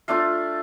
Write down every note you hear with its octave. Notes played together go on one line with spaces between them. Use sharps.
A3 D4 F4 F5